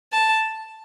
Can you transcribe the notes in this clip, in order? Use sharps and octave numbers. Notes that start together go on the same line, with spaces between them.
A5